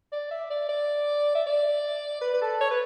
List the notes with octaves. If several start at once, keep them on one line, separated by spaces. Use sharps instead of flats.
D5
E5
D5
D5
E5
D5
B4
B4
A4
C#5
B4